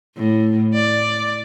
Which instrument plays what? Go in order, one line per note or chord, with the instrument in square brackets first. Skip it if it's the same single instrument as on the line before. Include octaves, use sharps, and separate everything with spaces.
[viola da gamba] A2
D5